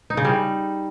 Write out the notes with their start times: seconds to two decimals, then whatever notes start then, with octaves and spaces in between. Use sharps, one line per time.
0.10 D#4
0.17 C#3
0.25 G3